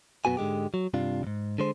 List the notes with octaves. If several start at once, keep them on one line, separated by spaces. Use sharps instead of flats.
F#2 B2 B3 F#4 G#5
G#2 D3 G#3 G4
F#3
G2 C3 D4 F4
D#2 G#2
D3 G#3 C5